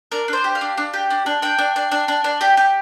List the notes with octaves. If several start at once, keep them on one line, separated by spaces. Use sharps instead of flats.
D4 A#4
D4 C5
G4
F5
D4
D4
G4
D4
D4
D4 G5
D4
D4
D4
D4
D4
G4
G4